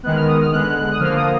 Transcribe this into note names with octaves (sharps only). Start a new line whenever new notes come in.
D#3 G#3 B3 F#6
F6
D#6
F6
D3 G#3 B3 F#6
D#6
D3 F3 A#3 F6
D#6